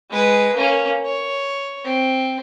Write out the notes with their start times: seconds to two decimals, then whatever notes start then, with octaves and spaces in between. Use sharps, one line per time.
0.10 G#3 B4
0.55 A#3 C#4
1.05 C#5
1.85 C4